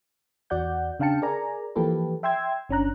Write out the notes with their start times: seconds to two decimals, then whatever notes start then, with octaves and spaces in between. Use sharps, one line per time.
0.50 E2 F#4 D5 F#5 G6
1.00 C#3 D4 F5 G5 A5 C#7
1.22 G#4 A#4 D5 G#5 A#5
1.76 E3 F3 A#3 G4 A4 B4
2.23 E5 G5 C6 E6 G#6
2.69 G1 C#4 D4 A#5 F#6